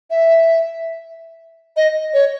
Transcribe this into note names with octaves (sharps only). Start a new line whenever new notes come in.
E5
D#5
C#5